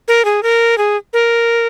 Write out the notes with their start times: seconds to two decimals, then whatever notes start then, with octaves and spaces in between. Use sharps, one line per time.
0.08 A#4
0.25 G#4
0.43 A#4
0.78 G#4
1.13 A#4